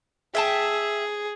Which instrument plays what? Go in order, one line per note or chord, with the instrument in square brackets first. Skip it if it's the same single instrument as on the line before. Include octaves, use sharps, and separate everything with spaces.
[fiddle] G#4 [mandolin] E5 G5 A5